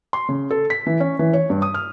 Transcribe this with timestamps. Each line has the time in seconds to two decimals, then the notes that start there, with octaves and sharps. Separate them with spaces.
0.13 C6
0.29 C#3
0.51 A4
0.70 B6
0.87 E3
1.00 C#4
1.19 E3
1.33 C#5
1.50 G2
1.62 D#6
1.74 F6